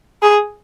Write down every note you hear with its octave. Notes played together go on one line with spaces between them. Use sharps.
G#4